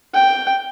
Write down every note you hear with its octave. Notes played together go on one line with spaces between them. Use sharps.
G5